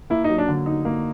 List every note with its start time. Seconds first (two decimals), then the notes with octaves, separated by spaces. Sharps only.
0.10 A#3 E4
0.24 D#4
0.29 F#3
0.38 D4
0.48 D3
0.66 D#4
0.85 A#3